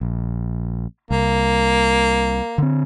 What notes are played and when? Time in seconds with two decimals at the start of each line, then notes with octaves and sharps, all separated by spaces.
0.01 A#1
1.11 C2 A#3
2.58 D3 C4